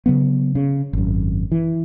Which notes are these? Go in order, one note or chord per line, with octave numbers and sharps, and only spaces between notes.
C#3 F#3 B3
C#3
G#1 F#2
E3